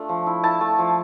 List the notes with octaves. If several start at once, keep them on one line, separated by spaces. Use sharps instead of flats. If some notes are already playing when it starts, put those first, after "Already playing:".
Already playing: A3 D4 F4
F3
E4
E4 A5
A3
F3